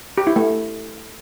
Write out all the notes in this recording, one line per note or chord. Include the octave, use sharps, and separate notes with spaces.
G4
E4
A3